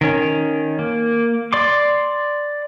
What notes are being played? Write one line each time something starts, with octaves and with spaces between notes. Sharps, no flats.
D#3 C#4
A#3
D5 C6 D6